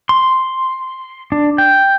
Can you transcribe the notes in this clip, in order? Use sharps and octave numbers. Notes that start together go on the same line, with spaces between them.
C6
D4
G5